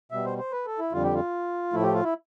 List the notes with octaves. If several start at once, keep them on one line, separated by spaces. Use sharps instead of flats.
B2 G3 E5
C5
C5
B4
A4
E4
F2 D3 G3 F4
G4
F4
A2 F3 A3 E4
G4
F4
E4